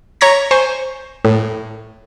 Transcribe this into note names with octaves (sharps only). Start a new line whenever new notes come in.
C#5 A#5 C#6 G#6 A#6 B6
C5 G#5 C#6
A2